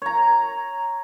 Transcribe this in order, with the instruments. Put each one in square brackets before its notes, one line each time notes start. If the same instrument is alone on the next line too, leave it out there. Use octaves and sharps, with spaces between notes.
[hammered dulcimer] C#5 A#5